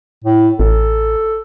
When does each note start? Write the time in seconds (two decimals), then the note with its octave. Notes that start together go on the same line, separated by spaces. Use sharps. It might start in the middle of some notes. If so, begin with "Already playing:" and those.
0.24 A2
0.60 A1 A4